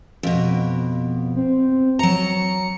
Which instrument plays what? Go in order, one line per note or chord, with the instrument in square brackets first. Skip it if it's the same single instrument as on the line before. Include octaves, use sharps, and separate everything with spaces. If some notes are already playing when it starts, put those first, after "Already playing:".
[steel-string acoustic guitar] F2 B2
[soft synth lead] C4
[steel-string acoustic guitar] F#3 A#5 [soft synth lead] C#7